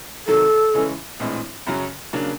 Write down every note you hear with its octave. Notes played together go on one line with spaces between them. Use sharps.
C3 D#3 F#3 A4
C#3 E3 G#3 C#4
A#1 A2 E3 G#3 C4
F#2 C#3 F#3
C#3 F#3 A#3 D4